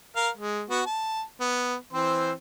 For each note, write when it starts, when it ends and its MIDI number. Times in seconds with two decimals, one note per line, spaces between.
0.16 0.29 70
0.16 0.29 77
0.37 0.64 56
0.70 0.81 59
0.70 0.81 66
0.86 1.23 81
1.40 1.75 59
1.93 2.32 52
1.93 2.32 60
1.93 2.32 72